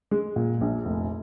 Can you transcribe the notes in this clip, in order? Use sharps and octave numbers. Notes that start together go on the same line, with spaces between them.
G#3
A#2
A#1
F1